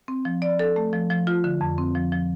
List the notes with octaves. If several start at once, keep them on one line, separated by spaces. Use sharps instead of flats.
C4
F3
D5
A4
A3
F3
F3
F4
D3
F2
C4
F3
F3